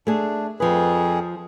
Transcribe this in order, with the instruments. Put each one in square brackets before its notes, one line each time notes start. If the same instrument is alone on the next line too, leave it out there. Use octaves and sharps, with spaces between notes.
[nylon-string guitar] A3 G#4 [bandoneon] D4
[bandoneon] F2 G#4 [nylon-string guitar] F3 B4